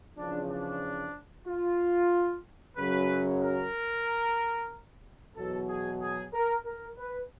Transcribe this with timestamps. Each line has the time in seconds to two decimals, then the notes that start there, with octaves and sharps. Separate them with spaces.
0.17 E2 C#3 F3 D4
0.50 D4
1.48 F4
2.77 F#2 C#3 F#3 B4
3.42 A#4
5.35 E2 B2 F#3 A4
5.69 G#4
6.01 G#4
6.33 A#4
6.65 A#4
6.98 B4